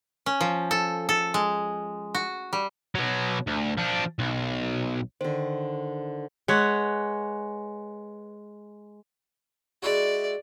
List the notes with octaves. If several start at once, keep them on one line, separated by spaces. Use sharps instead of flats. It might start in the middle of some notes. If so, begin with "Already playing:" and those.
C#4
F3
A4
A4
G#3
F#4
G3
B2 F#3
D2
F3 D4
B1
D3 D#3 C5
G#3 B4 C#5 F#5
G#3 E4 F#4 D5